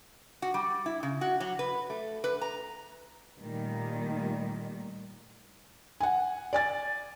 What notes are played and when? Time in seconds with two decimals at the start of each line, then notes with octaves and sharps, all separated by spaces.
0.42 F#4
0.54 G3
0.86 E4
1.03 C#3
1.21 F#4
1.40 F#3
1.59 B4
1.90 A3
2.24 B4
2.41 A#5
3.40 A#2 D#3 G3 A3
6.00 F#5 G#5
6.53 D5 G#5 A6